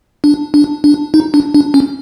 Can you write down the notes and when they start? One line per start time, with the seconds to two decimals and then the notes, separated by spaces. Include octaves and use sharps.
0.24 D4
0.54 D4
0.84 D4
1.14 D#4
1.34 D4
1.54 D4
1.74 C#4